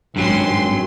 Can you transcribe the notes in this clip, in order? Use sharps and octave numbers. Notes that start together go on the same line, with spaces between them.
G#1 G2 F#3 C#4 C6